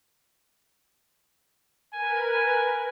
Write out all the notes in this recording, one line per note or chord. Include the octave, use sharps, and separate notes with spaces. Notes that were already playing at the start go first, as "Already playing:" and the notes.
A#4 B4 G#5